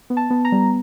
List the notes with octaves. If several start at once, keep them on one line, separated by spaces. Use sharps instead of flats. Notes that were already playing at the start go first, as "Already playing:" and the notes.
B3
A5
B3
A#5
G3